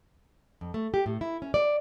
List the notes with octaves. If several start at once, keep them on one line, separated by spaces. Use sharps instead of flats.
F2
A3
G4
A2
E4
C#4
D5